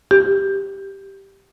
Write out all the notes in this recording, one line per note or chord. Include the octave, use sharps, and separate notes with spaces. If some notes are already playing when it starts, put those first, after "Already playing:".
G4